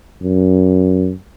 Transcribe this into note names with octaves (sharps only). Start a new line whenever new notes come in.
F#2